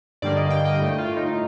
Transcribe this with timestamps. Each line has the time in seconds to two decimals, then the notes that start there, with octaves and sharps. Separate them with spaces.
0.22 G2 D3 G3 A#3 D5
0.37 D#5
0.50 G5
0.65 D#5
0.79 A2 A3
0.98 F4
1.17 D#4